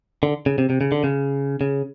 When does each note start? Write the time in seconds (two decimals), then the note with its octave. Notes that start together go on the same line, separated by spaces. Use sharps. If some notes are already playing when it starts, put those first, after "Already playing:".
0.23 D3
0.46 C#3
0.58 C3
0.70 C3
0.81 C#3
0.92 D3
1.04 C#3
1.61 C#3